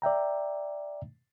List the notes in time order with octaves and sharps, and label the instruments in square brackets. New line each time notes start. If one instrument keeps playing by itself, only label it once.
[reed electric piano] D5 E5 G5 A#5